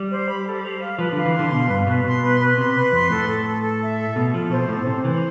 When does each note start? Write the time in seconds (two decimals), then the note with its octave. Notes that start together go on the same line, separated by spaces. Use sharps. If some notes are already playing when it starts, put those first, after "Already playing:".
Already playing: G3
0.11 C5
0.28 B5
0.46 A4
0.63 C5
0.81 F5
0.99 F3 B4
1.12 D3 F5
1.26 E3
1.33 C6
1.39 D3
1.52 B2 F5
1.69 G2 B4
1.87 B2 B4
2.04 B2 C6
2.22 B4
2.40 B4
2.58 C3 C6
2.74 B4
2.92 F2 C6
3.10 A2 A4
3.28 A4
3.46 A4
3.63 A4
3.81 E5
3.98 A4
4.15 B2 A4
4.34 F3 A4
4.50 B2 C5
4.69 A2 A4
4.86 C3 C5
5.04 E3 C5